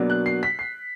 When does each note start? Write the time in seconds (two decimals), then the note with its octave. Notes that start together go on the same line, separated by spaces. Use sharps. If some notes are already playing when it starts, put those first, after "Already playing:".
Already playing: B2 F#3 A#3 D4
0.10 F#6
0.26 C7
0.43 B6
0.59 C7